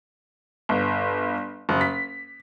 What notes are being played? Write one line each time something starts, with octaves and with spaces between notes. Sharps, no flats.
G1
F#1
B6